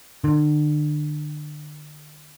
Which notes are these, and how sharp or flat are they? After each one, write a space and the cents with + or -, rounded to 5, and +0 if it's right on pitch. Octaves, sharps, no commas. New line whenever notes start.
D3 +35